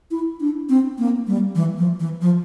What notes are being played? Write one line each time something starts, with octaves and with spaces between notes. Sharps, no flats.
E4
D4
C4
A#3
G3
E3
F3
E3
F3